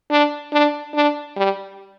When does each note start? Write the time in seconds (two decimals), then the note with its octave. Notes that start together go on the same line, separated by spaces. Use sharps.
0.10 D4
0.53 D4
0.94 D4
1.37 G3